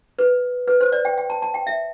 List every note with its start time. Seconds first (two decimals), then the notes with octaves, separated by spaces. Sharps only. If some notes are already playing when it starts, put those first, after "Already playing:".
0.19 B4
0.67 B4
0.81 C5
0.92 D5
1.05 G5
1.18 G5
1.30 A5
1.42 A5
1.54 G5
1.67 E5